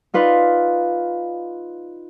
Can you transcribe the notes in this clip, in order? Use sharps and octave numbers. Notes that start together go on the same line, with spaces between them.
D#4 F4 B4 D5